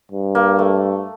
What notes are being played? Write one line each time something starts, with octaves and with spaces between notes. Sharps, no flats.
G2
A#3
A3